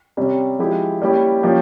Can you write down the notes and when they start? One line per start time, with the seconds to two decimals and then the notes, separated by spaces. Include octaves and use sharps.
0.17 C3 G3 C#4
0.59 F3 G#3 E4 G4
1.01 G3 A#3 C#4 E4 G4
1.43 F3 A#3 C#4 G4